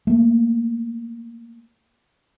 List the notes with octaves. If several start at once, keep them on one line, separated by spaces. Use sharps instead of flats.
A3 A#3